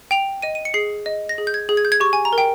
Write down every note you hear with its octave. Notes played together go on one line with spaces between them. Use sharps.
G5 F7
D#5 D#7
D#7
C#7
G#4 C7
D#5
A#6
G#4
G6
G#6
G#4
G#6
G6
G#6
G4 C#6
G#5
A#5
A#4
G5